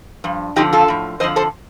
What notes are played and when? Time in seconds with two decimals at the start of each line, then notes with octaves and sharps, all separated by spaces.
0.24 G2 F3
0.56 F2 D3 F3 D#4 G4
0.73 F4 A4
0.88 A2 F3
1.20 F2 D3 F3 C5 D#5
1.36 A4 C5